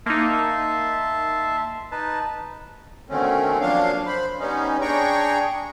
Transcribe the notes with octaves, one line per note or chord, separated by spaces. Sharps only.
A#3 D#4 E5 A5 C6
D#4 B4 A5
B2 D3 D#3 A3 C4 C#4
F3 F#3 A#3 D4 F5
C5 B5
G3 B3 C#4 D#4
D4 G#4 G5 A#5 C#6